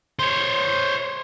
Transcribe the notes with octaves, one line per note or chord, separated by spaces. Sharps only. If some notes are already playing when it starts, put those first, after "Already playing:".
C5 C#5